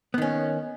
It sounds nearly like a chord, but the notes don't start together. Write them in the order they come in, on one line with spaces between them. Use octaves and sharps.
B3 D#3 C#4